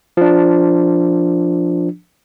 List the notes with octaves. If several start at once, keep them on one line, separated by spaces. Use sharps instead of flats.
F3 D4